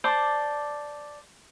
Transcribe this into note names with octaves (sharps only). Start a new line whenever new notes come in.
C5 D5 A5